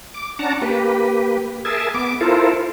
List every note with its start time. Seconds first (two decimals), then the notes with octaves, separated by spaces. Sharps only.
0.14 D6
0.39 C#4 D4 F#5 A5 A#5
0.61 A#3 G4 B4
1.65 G#4 A#4 E5 G#5 A5
1.94 B3 D6
2.21 E4 F4 A4 A#4 C5